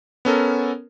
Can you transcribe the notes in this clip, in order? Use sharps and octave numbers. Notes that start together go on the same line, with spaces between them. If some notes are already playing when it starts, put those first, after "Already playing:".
B3 C#4 A4 A#4